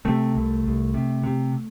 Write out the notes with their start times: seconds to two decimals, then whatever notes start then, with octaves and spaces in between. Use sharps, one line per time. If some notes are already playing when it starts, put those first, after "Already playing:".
0.05 C3 A3
0.35 C2
0.65 C2
0.94 C3
1.24 C3